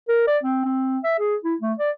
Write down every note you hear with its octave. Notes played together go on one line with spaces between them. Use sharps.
A#4
D5
C4
C4
E5
G#4
E4
A3
D5